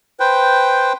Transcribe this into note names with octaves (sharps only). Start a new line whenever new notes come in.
B4 C5 G5